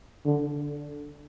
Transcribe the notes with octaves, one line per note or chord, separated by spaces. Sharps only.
D3